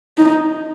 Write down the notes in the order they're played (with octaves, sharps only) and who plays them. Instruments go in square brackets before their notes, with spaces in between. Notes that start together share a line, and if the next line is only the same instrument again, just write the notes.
[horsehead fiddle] D#4